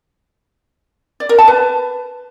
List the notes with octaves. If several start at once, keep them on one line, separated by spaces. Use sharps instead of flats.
D5
A#4
A5
B4